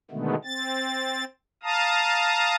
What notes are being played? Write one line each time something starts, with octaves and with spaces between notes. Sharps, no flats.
B2 D3 D#3 G#3 A3 B3
C4 A6
F5 A5 A#5 D#6